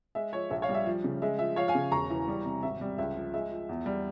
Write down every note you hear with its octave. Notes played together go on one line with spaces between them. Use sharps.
G#3 E5
F3 C#5
A#1 E5
C#5 F5
G3
E5
F3
C#3
G#3 E5
F3 E5
F3 C#5 F5
F5 G#5
C#3
E1 A#5 C#6
E3
G3
C3
G#1 E5
G3
C#2 E5
F3
G#3 E5
F3
E2
G3